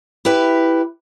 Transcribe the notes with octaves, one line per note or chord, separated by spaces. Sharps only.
E4 G4 B4